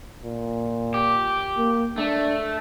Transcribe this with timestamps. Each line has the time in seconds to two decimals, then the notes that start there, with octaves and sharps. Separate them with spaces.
0.24 A#2
0.94 G4
1.58 A#3
1.98 A3 D4